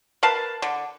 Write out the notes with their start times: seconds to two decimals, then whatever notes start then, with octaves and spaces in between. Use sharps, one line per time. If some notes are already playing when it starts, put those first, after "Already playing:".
0.23 A#4 B4 F5 A5
0.62 D3